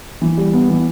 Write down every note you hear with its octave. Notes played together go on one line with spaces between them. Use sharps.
E3
G3
B3
E3